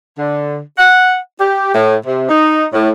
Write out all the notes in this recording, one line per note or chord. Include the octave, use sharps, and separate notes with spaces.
D3
F#5
G4
A2
C3
D#4
A2